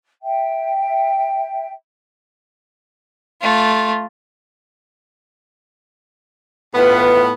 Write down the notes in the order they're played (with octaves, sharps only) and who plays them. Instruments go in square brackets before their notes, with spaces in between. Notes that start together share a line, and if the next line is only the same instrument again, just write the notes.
[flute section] E5 G5
[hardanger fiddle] A3 F4
[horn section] A2 B3 [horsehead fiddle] F4 B4